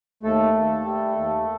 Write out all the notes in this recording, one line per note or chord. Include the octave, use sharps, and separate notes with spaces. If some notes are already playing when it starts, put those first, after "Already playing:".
D#2 A3 A4
D#2
G3
D#2